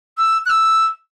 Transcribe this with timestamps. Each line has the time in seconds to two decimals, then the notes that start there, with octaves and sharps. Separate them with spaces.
0.18 E6
0.46 F#6
0.49 E6